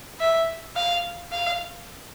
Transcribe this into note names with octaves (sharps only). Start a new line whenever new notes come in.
E5
F5
F5